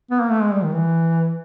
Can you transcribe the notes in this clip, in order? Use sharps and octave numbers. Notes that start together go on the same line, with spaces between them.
B3
A#3
A3
G#3
G3
D#3
E3